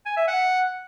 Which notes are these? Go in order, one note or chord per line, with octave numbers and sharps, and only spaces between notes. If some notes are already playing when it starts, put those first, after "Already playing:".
G#5
E5
F#5